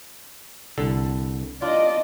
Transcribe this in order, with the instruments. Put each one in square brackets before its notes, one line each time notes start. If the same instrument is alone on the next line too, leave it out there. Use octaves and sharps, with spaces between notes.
[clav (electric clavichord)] C2 D3 A4
[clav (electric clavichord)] D4 F4 [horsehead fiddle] D5 D#5